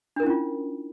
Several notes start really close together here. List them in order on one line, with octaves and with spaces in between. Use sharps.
D4 A#4 E4 C#4 F4